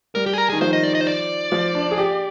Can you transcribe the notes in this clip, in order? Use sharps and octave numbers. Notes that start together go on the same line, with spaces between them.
G3 A#4
G4
G#4
A#4
D#3 G#4
F3 C5
D#5
D5
D#5
C5
D5
F3
D4
G#4
G4